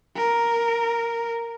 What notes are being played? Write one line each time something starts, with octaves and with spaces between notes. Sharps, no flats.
A#4